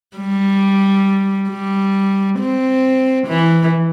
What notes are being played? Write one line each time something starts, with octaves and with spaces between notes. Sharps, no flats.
G3
G3
C4
E3